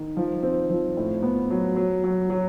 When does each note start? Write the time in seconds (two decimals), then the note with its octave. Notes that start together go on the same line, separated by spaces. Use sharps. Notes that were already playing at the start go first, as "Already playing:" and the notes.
Already playing: D#3
0.17 F3
0.43 C4
0.70 F3
0.97 A2
1.23 B3
1.50 F#3
1.76 F#3
2.04 F#3
2.30 F#3